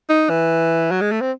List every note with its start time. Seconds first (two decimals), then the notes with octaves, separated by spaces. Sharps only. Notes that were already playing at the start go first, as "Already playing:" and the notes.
0.09 D#4
0.30 E3
0.91 F#3
1.01 G#3
1.12 A3
1.21 C4